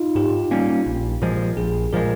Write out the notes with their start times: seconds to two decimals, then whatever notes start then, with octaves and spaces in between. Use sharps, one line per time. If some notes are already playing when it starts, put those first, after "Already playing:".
Already playing: D#4 F4
0.15 G#2 G4
0.51 G3 A#3 C#4
0.86 A#1
1.22 A#2 F3 G#3
1.57 A#1 G#4
1.93 A#2 F3 G#3 A#4